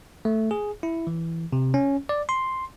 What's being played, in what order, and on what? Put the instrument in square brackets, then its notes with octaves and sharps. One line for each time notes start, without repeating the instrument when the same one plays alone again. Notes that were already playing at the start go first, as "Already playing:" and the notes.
[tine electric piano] A3
G#4
E4
E3
C3
C#4
D5
C6